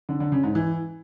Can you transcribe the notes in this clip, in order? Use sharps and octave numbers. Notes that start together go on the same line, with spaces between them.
D3
D3
C#3
G#2
E3